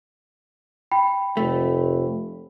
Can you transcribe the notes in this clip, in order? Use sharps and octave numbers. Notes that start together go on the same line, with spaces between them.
G5 B5
F1 A3